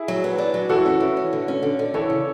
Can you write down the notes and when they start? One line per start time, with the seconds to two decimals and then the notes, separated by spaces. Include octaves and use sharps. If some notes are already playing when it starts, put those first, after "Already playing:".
Already playing: E4 G#4
0.08 F#3
0.24 B3
0.38 D4
0.54 F#3
0.69 E3 F#4 A4
0.86 C#4
1.00 E3
1.17 C#4
1.33 D3
1.48 C#4
1.63 D3
1.79 D3
1.94 E3 A4 C#5
2.10 C#3